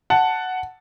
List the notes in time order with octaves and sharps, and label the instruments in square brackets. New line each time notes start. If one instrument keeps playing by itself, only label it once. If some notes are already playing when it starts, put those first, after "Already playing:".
[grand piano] F#5 A5